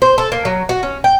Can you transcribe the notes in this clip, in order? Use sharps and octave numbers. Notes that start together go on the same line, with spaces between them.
C5
A4
A#3
F#3
F#4
C#4
G5